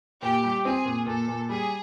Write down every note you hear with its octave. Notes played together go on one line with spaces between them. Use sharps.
A#2 G4
G3
C4 G#4
A#2
A#2 A4
A#2
G3 G#4